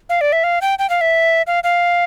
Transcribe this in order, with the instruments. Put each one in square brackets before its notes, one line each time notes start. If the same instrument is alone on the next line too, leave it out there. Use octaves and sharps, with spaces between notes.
[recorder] F5
D5
E5
F5
G5
G5
F5
E5
F5
F5